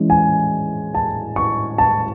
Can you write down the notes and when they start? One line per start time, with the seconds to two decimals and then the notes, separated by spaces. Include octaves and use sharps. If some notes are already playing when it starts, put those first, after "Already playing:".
Already playing: E3 G#3 C#4
0.10 G#5
0.95 A5
1.36 C#6
1.78 A5